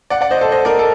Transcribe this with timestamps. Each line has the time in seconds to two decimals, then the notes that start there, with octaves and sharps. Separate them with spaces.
0.10 D5 F#5
0.21 D5 F#5
0.31 C5 D#5
0.41 A4 C5
0.51 C5 D#5
0.65 A#4 D5
0.79 A4